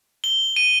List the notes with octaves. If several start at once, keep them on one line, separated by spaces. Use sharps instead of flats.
G7
D#7